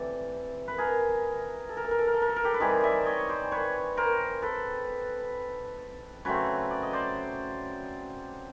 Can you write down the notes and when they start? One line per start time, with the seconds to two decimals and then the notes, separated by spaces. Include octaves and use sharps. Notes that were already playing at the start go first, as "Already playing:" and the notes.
Already playing: C3 E3 A3 D5
0.68 B4
0.78 G#4 A#4
1.69 A4
1.77 A#4
1.84 A4
1.91 A#4
1.99 A4
2.07 A#4
2.14 A4
2.22 A#4
2.29 A4
2.36 A#4
2.44 G4 A4
2.54 B4
2.60 E3 G3 C4 D#4 G#4 A#4
2.83 D5 E5
3.06 C#5 D#5
3.29 C5 D5
3.52 B4 C#5
3.97 A#4 C5
4.42 A4 B4
6.25 C#3 F#3 A3 C4 B4 C#5
6.70 D5
6.83 D#5
6.93 C5 D5